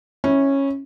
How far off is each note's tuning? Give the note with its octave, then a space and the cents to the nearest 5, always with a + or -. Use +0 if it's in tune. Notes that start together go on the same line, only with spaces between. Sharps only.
C#4 -10 E4 -20